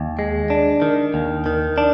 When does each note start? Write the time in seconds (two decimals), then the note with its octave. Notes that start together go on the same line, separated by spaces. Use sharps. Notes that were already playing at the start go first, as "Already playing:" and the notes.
Already playing: D#2
0.19 G#3
0.50 D4
0.82 D#3
1.14 D#2
1.46 D#3
1.78 D4